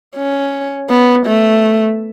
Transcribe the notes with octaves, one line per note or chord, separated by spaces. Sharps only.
C#4
B3
A3